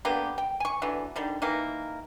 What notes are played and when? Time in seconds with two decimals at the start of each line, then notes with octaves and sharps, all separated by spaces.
0.05 D3 A#3 B3 G4
0.38 G5
0.60 G#5 C#6
0.82 D3 E3 F#3
1.16 D3 D#3 G3
1.42 D#3 E3 A#3